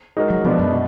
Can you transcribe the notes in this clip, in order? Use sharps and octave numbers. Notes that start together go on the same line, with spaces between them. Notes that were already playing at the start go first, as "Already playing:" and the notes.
G#3 D#4 F#4 A#4
F#3
B2 F3 G#3 B3 D4
F#2
B2